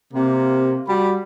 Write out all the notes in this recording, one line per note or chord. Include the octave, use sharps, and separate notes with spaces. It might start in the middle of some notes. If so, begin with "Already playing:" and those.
C3 A#3
G3 F#4 B5